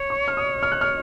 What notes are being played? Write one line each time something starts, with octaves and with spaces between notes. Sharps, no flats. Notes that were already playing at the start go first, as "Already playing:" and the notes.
Already playing: C#5
C#6
F6
D#6
F6
F#6
F6